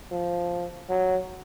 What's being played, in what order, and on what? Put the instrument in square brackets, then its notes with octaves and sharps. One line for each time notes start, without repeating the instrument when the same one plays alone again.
[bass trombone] F3
F#3